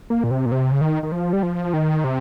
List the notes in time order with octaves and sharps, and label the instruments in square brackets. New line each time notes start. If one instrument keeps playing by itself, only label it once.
[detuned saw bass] A#3
A#2
C3
A#2
C3
C#3
D#3
D#3
F3
G3
F3
D#3
C3